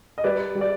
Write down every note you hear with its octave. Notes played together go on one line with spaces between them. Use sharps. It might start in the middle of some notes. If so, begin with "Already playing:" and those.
D#5
G3 B4 D5
G3
D5